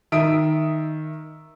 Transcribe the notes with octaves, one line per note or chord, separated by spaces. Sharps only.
D#3 E5 D#6 D7